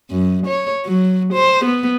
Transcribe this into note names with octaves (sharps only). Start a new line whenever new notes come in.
F#2
C#5
F#3
C5
B3